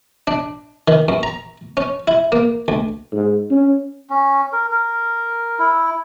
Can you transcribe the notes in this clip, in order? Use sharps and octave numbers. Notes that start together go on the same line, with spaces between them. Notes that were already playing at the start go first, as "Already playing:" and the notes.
D4
D#3
F#2
A#5
C#4
E4
A#3
D2
G#2
C#4
C#4
A#4
A#4
E4